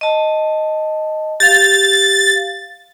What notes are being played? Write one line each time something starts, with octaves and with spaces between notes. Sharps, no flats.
D#5 A5
G4 F5 A6